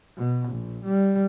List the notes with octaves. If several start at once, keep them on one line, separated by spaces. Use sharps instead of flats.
B2
A#1
G3